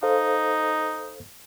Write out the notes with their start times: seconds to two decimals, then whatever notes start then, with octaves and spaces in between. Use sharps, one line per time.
0.03 D#4 A4 C5 F5